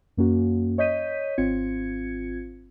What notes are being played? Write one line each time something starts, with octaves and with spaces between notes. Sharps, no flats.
F#2 A#3 C#4 F#4
C#5 D#5 G6 B6 D#7
G#1 C4 F4 G#6 C#7